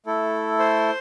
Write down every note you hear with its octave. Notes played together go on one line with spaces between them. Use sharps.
A3 E4 A4
C5 C6